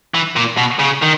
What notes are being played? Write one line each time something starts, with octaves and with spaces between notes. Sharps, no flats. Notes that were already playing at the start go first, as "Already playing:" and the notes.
E3
A#2
B2
C#3
D#3